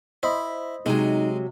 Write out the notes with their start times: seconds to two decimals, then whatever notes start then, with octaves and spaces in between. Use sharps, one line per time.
0.23 E4 C5 D#5 B5
0.86 C3 F#3 G#3 D#4